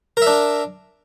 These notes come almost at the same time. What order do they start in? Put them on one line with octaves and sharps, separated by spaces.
A#4 E5 D4